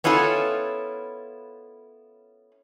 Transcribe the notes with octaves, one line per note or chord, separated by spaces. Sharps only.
B3 C#4 E4 F4 A4